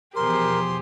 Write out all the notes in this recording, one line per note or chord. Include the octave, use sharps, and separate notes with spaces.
E2 B2 F3 G4 G#4 A#4 C5 C6